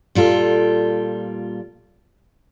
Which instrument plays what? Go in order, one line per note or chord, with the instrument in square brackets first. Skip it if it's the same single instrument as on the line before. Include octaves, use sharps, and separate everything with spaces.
[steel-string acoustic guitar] A#2 G3 F4 A4